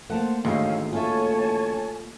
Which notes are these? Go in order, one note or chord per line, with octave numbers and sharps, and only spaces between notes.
A3 A#3 C5 F#5 A5
A1 D2 G#2 D#3 C#4 D#5 F5 E6
F4 A4 C#5 E5 G#5 A5